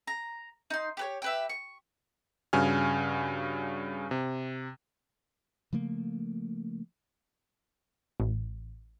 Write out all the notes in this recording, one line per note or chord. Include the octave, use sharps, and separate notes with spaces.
A#5
D#4 C6
G4 B4 C#5
G4 B4 E5
C#6
G2 C#3 F#4 G#5 F6
C3
C#3 F3 A3 A#3
A1